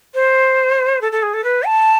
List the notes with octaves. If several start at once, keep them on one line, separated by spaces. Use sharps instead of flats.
C5
A4
A4
G#4
A4
B4
A5